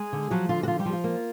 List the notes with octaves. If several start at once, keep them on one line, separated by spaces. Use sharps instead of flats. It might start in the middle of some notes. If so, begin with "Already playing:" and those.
Already playing: G#3 G#4
D3
F3 F#3 F#4
D3 F4
F#4
F3 F4
G3 G4
F3
F4
A#3